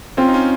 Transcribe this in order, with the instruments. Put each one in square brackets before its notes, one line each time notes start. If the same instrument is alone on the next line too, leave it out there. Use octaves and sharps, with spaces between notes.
[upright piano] C4 [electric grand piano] C#4 F4
[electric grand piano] D#4
C#4 F4